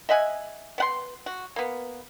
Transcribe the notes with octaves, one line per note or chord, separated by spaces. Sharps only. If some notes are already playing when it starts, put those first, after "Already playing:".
D#5 E5 F#5 G#5
B3 F#5 C6
F#4
A#3 B3